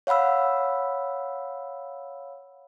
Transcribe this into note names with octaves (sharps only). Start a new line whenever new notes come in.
C#5 F5 F#5 B5 E6